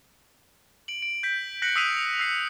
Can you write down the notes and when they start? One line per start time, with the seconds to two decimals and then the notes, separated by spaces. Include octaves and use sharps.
0.88 D7 F#7
1.02 D7
1.23 G6 B6
1.62 F#6 A#6 B6 C#7 F#7
1.76 D#6 E6 B6 C7 D#7 F7
2.20 E6 C7 C#7